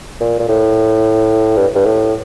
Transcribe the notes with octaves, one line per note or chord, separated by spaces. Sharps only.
A#2
A#2
A2
G2
G2
A2